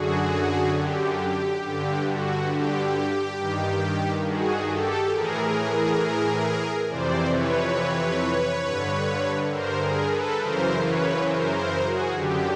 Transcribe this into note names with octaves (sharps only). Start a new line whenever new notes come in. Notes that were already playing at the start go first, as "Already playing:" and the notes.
Already playing: F#2 D3 F#4 G#4
G4
G4
G2 D3 G4
F#4
G4
G2 D#3
F#4 G#4
G4 A4
A2 E3 G#4 A#4
F2 C3 E3 C5 D5
B4 C#5
G2 D3
A#4 C5
G#4 A#4
A4 B4
F#2 C#3 E3 A#4 C5
B4 C#5
A#4 C5
A#4 C5
F#4 G#4
F#2 D3 G4